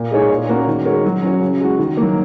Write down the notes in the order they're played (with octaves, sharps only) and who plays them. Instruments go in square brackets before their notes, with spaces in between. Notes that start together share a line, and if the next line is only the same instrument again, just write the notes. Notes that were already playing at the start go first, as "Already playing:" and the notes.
Already playing: [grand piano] A#2
G#3 D#4 G#4 C#5
A#2
A#3 C#4 F#4 A#4
D#3
G#3 F#4 A#4 C#5
F#3
C#4 F#4 C#5
C#3
G#3 F#4
D#3
F#3 A#3